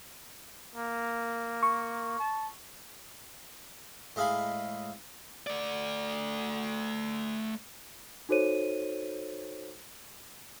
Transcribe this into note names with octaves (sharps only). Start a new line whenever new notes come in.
A#3
C#6
A5
A2 G#3 D#5 F5 G#5 B5
A3 D5
D#4 F#4 A4 C5 C#5 D#7